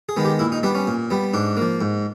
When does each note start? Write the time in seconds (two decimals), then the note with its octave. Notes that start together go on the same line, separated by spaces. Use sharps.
0.09 G#4
0.17 D#3 G#3 B3
0.25 G4
0.39 A#2 E4
0.52 D#4
0.63 G3 B3 D4
0.75 C#4
0.87 A#2
1.10 G3 B3
1.34 G#2 D4
1.57 F3 A#3
1.81 G#2